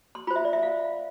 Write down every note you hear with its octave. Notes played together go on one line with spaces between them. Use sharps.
C6
F4 C5 B5
E5
D5
E5
F5